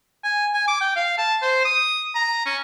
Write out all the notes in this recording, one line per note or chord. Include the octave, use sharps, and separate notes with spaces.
G#5
G#5
D6
G5
F5
A5
C5
D#6
A#5
C#4